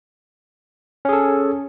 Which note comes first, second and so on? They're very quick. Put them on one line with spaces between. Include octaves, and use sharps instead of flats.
C#4 G#4 A4